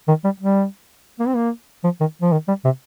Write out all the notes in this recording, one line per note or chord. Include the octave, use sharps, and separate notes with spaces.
D#3
G3
G3
A#3
C4
A#3
F3
D#3
F3
D#3
G3
C3